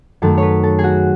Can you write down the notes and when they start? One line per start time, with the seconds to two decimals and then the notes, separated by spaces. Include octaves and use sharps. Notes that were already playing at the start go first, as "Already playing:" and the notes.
0.22 F#2 D#3 A3 A4
0.38 B4 C#5
0.63 A4
0.79 G#4
0.84 F#4